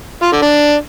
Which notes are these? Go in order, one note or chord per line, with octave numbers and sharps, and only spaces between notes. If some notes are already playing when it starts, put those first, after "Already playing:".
F4
D3
D4